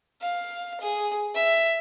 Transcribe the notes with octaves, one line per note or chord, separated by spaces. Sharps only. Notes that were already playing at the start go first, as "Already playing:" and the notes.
F5
G#4
E5